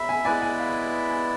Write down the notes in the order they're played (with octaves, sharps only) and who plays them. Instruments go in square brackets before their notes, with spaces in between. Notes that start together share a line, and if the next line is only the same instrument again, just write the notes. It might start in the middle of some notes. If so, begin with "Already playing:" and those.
Already playing: [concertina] E5 [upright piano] B5
[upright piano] G#5
[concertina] G#3 B3 E4 B4 D5 [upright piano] G#5
[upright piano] G#5
F5
G#5